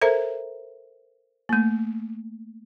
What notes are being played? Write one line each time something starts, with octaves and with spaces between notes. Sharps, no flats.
A4 A#4 C5 E5 A#5
A3 A#3